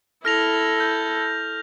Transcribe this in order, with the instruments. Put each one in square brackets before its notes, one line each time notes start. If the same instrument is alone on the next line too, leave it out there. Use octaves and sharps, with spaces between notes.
[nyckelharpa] E4 A4 [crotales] F6 A#6 F7
[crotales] G6